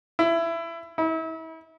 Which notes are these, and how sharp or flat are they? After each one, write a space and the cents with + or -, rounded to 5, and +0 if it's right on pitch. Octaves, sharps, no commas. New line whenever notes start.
E4 +20
E4 -35